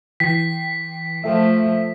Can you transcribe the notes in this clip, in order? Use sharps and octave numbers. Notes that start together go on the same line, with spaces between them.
E3 G5 B6 C7
F3 A3 A4 E5